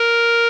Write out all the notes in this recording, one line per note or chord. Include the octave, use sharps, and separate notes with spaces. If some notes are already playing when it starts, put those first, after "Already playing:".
Already playing: A#4